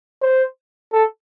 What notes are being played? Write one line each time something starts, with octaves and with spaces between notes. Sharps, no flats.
C5
A4